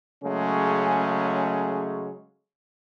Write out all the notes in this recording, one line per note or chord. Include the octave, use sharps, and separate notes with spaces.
C#3 F#3 G#3 A3 C#4